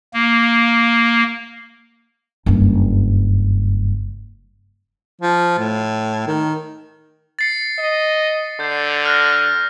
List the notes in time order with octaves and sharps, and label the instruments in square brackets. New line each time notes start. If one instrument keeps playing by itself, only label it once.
[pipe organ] A#3
[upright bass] F#1 G2
[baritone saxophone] F3
A2
D#3
[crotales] A6 C7 C#7
[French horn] D#5
[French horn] D3 [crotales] G6 C7
[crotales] F6 F#6 A#6